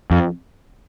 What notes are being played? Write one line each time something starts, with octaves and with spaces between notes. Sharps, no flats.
F2